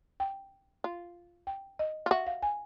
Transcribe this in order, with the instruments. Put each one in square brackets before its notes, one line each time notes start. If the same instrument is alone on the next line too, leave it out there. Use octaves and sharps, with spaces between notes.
[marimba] G5
[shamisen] F4
[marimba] G5
D#5
[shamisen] F4
[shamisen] F#4 [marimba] E5
[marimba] F5
G#5